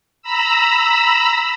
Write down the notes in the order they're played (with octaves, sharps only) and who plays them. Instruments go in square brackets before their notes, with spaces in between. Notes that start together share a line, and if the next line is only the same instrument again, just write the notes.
[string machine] A#5 B5 E6